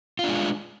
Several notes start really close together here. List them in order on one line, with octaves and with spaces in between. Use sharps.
F4 D4 G#3